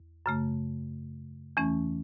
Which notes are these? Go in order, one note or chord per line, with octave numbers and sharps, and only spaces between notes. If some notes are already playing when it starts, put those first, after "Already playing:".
Already playing: E2
F#2 C#3 A3
E2 E3 A3 C#4